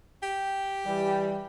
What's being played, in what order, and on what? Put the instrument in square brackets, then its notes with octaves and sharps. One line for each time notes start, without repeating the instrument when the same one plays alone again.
[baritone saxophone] G4
[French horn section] E3 G3